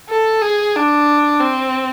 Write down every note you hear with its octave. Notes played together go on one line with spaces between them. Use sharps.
A4
G#4
D4
C4